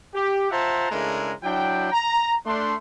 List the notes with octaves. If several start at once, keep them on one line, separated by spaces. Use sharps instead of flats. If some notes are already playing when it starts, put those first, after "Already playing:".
G4
F4 C5 E5 F#5 A5 A#5
C#3 G#3 A3 D4 E4 A#4
F#3 D4 E4 G5
A#5
A3 D4 C6